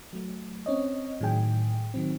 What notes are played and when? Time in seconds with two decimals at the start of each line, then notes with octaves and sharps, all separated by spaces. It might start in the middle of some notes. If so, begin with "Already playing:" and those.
0.13 F#3 A3
0.66 C4 C#4 C#5 D#5
1.21 A2 D#3 F#3 G#4 G5 G#5
1.94 D#3 F#3 C4